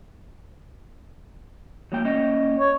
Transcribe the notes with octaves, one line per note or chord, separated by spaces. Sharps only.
F#3 A#3 G5
A#3 C#4 D#5
C#5